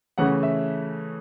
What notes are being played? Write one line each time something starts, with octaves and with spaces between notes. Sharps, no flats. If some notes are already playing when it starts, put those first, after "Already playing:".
C#3 E3 A3 C#4 F#5
E5